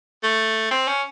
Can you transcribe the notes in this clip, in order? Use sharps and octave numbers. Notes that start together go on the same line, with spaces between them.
A3
C4
C#4